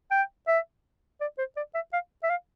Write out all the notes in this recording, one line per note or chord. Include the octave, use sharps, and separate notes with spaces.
G5
E5
D5
C5
D5
E5
F5
E5
F5